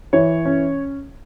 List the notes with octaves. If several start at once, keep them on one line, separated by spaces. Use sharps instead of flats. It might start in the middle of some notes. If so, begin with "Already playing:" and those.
E3 C#5
C#4